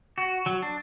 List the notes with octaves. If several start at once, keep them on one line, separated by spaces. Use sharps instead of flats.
F#4
F#3
D4